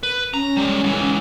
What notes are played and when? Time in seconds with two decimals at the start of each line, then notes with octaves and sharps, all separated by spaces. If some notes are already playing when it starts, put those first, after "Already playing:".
0.03 B4
0.34 C#4 A#5
0.57 G3 G#3
0.83 G#2 E3